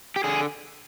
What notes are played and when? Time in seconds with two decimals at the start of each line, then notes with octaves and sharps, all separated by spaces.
0.16 G4
0.24 D3 G#4